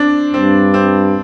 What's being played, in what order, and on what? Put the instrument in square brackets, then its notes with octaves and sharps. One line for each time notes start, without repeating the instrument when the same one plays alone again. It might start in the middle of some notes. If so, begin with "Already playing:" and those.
Already playing: [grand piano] C4 D4
[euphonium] G2 [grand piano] C4
[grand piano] C4